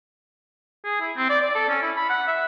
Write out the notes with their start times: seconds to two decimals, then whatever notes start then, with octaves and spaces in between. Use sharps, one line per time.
0.84 G#4
1.01 E4
1.16 C4
1.29 D5
1.42 D5
1.55 A4
1.69 C#4
1.82 E4
1.97 B5
2.09 F#5
2.27 E5